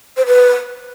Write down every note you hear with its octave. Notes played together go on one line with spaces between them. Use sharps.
C5
B4